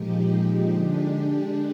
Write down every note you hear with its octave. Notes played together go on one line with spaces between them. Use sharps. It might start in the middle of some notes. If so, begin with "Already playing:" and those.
Already playing: A#2 F3 G#3 D#4 G4
D3 G#3 D4 G4